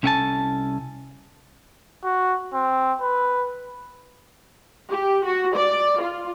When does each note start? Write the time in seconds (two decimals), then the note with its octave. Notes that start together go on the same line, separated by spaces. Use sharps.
0.03 C2 C#4 A4 F#5 G#5 A5
2.04 F#4
2.54 C4
3.01 B4
4.90 G4
5.25 F#4
5.55 D5
6.00 F4